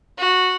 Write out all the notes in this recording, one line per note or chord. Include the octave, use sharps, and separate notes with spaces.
F#4